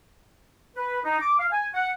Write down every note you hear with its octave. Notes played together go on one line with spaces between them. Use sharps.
B4
D#4
D6
F5
G#5
F#5